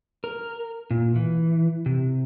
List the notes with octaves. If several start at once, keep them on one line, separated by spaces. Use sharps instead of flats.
A#4
A#2
E3
C3